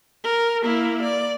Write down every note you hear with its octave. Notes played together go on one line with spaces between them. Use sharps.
A#4
A#3 E4
D5